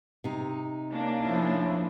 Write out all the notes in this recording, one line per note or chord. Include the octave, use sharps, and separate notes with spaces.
C3 D#4
A#3 C#4 D4
F3 E4